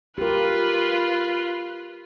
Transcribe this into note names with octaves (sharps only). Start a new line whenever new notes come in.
F4 G4 A#4 B4